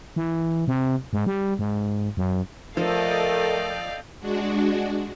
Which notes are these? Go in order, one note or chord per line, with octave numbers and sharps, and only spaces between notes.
E3
C3
G#2
G3
G#2
F#2
F3 A3 A4 A#4 D5 D#5 F5 G5
G#3 D4 F#4